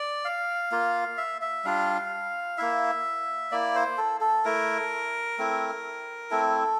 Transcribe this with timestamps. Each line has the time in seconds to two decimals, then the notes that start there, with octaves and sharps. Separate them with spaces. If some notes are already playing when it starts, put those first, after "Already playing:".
Already playing: D5
0.25 F5
0.72 A#3 F4
1.17 E5
1.42 E5
1.65 G3 D4 F4 F5
2.58 A#3 E4 E5
3.51 A#3 E4 D5
3.75 C5
3.98 A4
4.21 A4
4.45 A3 E4 A#4
5.38 A3 C4 E4
6.31 A3 C4 E4 A4